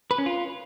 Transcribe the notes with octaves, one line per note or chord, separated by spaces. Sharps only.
B4
C#4
F4